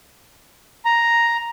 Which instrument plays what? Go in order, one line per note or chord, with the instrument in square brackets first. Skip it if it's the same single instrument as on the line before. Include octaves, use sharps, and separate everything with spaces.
[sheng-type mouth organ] A#5